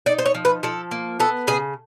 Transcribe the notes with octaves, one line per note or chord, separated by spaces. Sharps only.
D#4 D5
C5
C#5
F3
B4
F3 A4
A#3
B3 A4
C#3 G#4